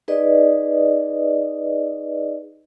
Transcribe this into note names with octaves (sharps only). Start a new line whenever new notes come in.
D#4 G#4 B4 D5 D#5